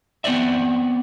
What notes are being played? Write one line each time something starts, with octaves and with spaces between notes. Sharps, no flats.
B3 C4 C5 D5 E5